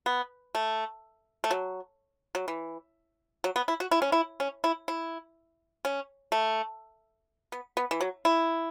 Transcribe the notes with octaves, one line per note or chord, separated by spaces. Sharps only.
B3
A3
A3
F#3
F#3
E3
F#3
B3
E4
F#4
E4
C#4
E4
C#4
E4
E4
C#4
A3
B3
B3
E3
F#3
E4